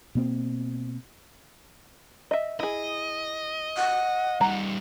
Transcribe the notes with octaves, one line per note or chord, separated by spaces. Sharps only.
B2 A#3 C4
D#5 E5
E4 G#4 D#5
F#5
G3 D#4 A#5